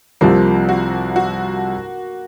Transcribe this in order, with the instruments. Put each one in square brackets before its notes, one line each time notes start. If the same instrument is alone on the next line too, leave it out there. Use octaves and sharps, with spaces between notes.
[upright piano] C2 C3 F3 C4 [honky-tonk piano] A#3
[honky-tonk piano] F#4
F#4